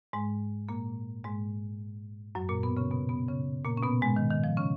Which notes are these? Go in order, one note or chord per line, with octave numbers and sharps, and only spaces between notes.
G#2 G#3
A#2 A#3
G#2 G#3
F#2 F#3
A#2 A#3
B2 B3
C#3 C#4
B2 B3
B2 B3
C#3 C#4
A#2 A#3
C#4
B2 B3
G#2 G#3
D#3
D#3
F3
C#3 C#4